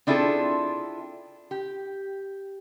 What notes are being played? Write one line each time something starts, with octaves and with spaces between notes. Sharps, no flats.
C4 D4 E4 F4 G#4 A4
G4